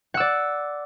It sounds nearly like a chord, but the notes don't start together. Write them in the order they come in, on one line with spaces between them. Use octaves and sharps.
F#5 E6 D5